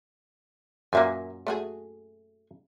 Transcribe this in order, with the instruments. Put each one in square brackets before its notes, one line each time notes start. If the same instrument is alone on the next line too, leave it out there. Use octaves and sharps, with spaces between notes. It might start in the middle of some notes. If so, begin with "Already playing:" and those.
[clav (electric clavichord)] F#2 A#2 A#3 [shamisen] B4 E5 G#5
[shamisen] A3 F#4 G#4